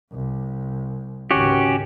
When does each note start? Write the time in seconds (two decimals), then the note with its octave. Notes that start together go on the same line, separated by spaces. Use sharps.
0.13 C2
1.31 G#1 C#2 C#4 F#4 G4